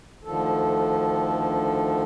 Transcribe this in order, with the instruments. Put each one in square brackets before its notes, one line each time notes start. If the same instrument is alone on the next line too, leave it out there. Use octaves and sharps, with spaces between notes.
[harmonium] D2 D3 D#3 F3 A4